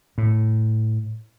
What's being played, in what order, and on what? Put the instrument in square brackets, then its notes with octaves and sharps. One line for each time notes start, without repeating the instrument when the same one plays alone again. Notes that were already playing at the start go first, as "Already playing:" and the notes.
[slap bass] A2